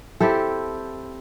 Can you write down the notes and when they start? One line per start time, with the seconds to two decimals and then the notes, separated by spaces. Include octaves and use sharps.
0.20 C4 E4 G4 A4